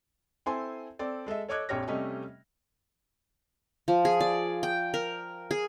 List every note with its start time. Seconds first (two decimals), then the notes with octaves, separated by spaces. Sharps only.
0.46 C4 E4 A4 C5 G#5 C6
0.99 C4 A4 D5
1.26 G#3 A4 D#5 E5
1.49 A4 C#5 D#5 D6 F#6 G#6
1.69 A#1 F2 G4 C#5 F6 A#6
1.88 C3 G3 A3 C#4 G4 D#5
3.88 F3
4.05 G#4
4.20 D5
4.63 G5
4.94 A#4
5.51 G#4